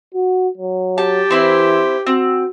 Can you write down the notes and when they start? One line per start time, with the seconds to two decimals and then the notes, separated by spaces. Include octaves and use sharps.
0.15 F#4
0.58 F#3
0.98 G4 A5
1.31 E3 C4 E4 C5
2.06 C4 F#4